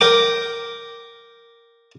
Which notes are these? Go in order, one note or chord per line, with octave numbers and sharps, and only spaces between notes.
A#4 G5 D6